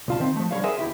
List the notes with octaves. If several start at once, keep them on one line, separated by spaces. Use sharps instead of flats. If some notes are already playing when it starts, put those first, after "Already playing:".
C2 F4 A5
D#3 C4
F3 A3
D3 G3 C#5 F5
G#4 A#4 C5 E5 F#5 G#5
D#2 E4 G4 E5